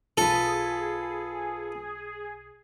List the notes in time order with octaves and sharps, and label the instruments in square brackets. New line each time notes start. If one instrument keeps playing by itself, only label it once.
[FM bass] B1 [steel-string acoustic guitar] F4 B4 [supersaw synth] G#4 [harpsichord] A4